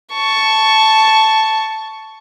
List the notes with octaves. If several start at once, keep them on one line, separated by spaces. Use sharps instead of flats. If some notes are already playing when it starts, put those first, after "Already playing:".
A5 C#6